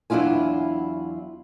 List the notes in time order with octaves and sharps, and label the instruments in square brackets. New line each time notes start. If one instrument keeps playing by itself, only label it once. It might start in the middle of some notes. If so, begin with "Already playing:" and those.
[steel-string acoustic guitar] E2 F#3 D4 E4 F4 G#5